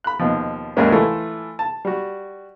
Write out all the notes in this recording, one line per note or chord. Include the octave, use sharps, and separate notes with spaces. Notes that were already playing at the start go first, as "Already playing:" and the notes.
B5 F#6
D#2 B2 F3
D#2 G#2 G3 G#3 A#3 C#4
E3 A3 E4 F4 A4
A5
G3 F#4